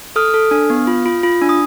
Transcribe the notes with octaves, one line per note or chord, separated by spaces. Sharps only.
A4 D#6 F6
A4
D4
B3
F4
F4
F4
D4
D#6